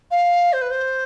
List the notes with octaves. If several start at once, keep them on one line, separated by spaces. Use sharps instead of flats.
F5
C5
B4
C5